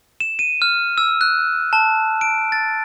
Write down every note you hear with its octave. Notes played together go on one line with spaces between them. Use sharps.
E7
D#7
F6
E6
F#6
A5
D7
A6